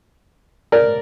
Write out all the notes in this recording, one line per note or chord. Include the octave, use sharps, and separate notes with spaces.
A#4 D5